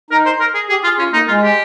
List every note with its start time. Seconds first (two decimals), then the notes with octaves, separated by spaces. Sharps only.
0.11 D#4 A#4
0.26 C5
0.40 A#4
0.55 G#4
0.69 G4 G#4
0.84 F4 G#4
0.99 C#4 F4
1.13 A#3 D#4
1.28 G#3 F4
1.43 G4